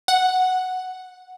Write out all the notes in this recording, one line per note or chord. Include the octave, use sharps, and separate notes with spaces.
F#5